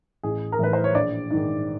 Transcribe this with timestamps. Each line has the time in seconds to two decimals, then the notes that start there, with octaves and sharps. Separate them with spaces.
0.23 A1 G#4
0.52 A#4
0.59 A2 E3 B4
0.73 C5
0.84 C#5
0.94 A#1 D5
1.31 G#2 D#3